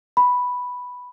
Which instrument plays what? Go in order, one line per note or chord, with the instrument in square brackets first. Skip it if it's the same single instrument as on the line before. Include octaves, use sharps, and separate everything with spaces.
[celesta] B5